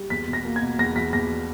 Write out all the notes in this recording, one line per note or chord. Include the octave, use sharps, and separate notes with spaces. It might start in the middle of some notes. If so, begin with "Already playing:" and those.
Already playing: G3
E2 B6
B2
A#6
A#3
G#6
B2
E2 A#6
E2 B6
E2 A#6